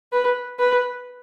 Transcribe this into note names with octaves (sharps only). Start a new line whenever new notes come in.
B4
B4